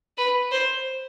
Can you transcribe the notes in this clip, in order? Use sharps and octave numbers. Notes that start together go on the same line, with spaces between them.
B4
C5